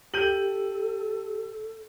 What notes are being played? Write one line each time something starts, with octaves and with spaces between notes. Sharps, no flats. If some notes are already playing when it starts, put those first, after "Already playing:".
G4 A4 G6 D#7 F#7